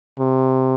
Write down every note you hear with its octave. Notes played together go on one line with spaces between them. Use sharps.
C3